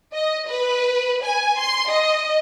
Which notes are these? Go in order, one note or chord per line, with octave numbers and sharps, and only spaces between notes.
D#5
B4
G#5
C6
D#5